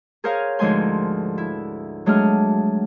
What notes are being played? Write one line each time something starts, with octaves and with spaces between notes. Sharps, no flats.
G#4 A#4 C5 C#5 F5 G#5
D2 G#2 F3 G#3 G#5 C6
E4
F#3 G#3 A3 D4 G#4 F6